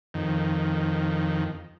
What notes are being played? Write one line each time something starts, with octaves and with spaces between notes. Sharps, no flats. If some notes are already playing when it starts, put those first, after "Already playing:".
F2 D#3